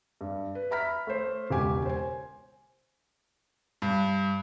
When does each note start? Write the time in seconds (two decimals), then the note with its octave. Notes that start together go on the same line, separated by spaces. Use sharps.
0.21 G2
0.55 B4
0.71 E5 A#5 B5 F6 B6
1.07 A3 C5
1.50 E1 C#2 G4 G#5
1.86 C5 G#5
3.82 G2